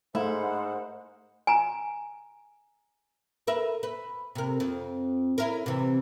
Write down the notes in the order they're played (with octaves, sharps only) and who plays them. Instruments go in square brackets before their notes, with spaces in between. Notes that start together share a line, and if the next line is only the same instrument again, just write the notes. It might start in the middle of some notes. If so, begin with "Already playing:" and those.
[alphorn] G#2 [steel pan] A3 F5 [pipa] E4 [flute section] A#4 C5 F#5
[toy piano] G#5 A#5
[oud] A#4 B4 E5
B4
C3 A#4
F2
C#4 E4 A#4
C3 E3